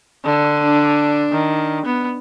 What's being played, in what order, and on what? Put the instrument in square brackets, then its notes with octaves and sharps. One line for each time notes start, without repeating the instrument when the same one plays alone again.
[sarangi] D3
[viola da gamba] D4
[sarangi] D#3
B3